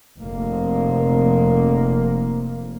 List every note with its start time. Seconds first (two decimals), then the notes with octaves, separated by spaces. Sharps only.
0.18 F1 A#3